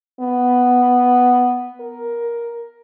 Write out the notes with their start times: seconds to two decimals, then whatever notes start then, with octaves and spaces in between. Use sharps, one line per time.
0.20 B3
1.80 A#4